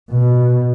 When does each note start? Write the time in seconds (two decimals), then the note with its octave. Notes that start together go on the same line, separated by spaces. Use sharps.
0.11 B2